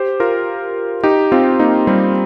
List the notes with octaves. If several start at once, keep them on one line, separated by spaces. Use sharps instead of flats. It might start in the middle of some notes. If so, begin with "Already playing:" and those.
Already playing: G4 C5
F4 A#4
D#4 G4
C4 F4
A#3 D#4
G3 C4